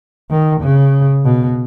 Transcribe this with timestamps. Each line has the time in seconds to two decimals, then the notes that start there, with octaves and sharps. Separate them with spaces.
0.31 D#3
0.62 C#3
1.25 B2